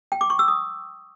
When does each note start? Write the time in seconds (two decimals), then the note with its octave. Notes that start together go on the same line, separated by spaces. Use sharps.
0.12 G5
0.21 D6
0.30 C#6
0.39 E6
0.48 D#6